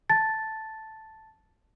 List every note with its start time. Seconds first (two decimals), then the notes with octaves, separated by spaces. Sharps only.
0.10 A5 A6